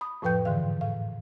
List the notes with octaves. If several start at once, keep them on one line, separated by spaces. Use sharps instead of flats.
B5 D#6
F2 A2 F3 B4 G5 G6
G#2 D3 E3 F5
A2 F5